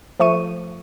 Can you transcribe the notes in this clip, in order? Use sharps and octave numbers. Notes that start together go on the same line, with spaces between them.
F3 A3 C#6 D#7